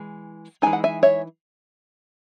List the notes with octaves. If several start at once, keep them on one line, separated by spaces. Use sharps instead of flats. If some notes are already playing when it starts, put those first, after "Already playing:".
Already playing: E3 G#3
E3 G#3 D#4 G#5
F#5
E5 G#5
C#5 E5